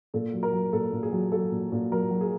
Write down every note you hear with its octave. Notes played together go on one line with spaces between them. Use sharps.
A#2 A4
F#3
A#4
F#3
A#2 A4
A#2
G#4
F#3
F#3 A4
A#2
A#2
F#3 A#4
F#3
G#4